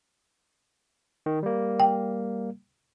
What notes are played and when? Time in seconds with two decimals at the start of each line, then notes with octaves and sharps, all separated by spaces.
1.26 D#3
1.43 G3 A#3
1.80 G5